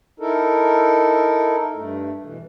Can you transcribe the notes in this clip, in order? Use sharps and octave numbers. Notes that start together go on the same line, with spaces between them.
D#4 E4 A4 A#4
G2 A3
B2 E3